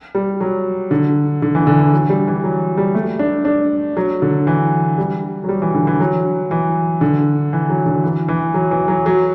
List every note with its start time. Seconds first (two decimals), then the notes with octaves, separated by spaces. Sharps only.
0.15 G3
0.41 F#3
0.91 D3
1.42 D3
1.55 E3
1.67 D3
1.79 E3
1.93 F#3
2.10 G3
2.27 E3
2.44 F#3
2.77 G3
2.95 A3
3.19 D4
3.45 D4
3.97 F#3
4.22 D3
4.47 E3
4.98 G3
5.44 F#3
5.49 G3
5.62 E3
5.75 D3
5.87 E3
6.00 F#3
6.51 E3
7.01 D3
7.53 E3
7.70 F#3
7.86 D3
8.04 E3
8.28 E3
8.54 F#3
8.71 E3
8.88 F#3
9.06 F#3